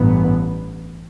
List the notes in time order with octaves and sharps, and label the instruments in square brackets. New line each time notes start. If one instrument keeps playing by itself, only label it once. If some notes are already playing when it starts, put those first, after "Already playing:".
Already playing: [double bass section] A1 G2 E3 B3